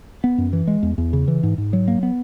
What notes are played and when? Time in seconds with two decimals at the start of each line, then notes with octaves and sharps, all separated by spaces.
0.24 B3
0.38 F#2
0.53 E3
0.67 G#3
0.83 E2
0.98 E2
1.13 C#3
1.28 E3
1.43 G#2
1.58 G#2
1.73 F#3
1.88 A#3
2.03 B3